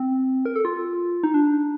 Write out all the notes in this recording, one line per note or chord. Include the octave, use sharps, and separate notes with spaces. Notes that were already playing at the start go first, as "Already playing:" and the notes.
Already playing: C4
A#4
A4
F4
D#4
D4